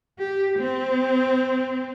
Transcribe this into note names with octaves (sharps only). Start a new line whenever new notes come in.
G4
C4